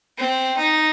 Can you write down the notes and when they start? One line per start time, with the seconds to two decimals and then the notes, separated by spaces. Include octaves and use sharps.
0.18 C4
0.57 D#4